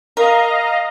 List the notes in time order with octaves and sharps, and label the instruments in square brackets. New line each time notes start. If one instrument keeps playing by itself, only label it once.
[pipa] A#4 [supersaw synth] D#5 F5 A#5